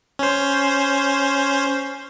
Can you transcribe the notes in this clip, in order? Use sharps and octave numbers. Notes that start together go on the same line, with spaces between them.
C#4 C5